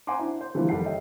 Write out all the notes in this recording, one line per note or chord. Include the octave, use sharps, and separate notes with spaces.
C5 F#5 G#5 A#5 C6 D6
D4 E4
C5
D3 E3 F3 G3 A#3 E4
F#1 D#3 G3 A4 F#5 C7
C#5 D#5 E5 G5